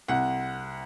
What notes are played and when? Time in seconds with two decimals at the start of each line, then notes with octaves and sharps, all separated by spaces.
0.08 C2 F#5